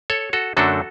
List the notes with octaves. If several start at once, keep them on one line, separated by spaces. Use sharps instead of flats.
A4 C#5
F#4 A4
F#2 D3 F#3 A3 D4 F#4 A4